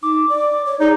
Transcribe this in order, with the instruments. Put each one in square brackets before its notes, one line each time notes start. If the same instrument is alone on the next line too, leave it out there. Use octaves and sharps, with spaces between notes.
[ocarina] D#4 [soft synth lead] D6
[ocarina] D5
C#5
[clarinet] D#4 [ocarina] G#4 [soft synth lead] D5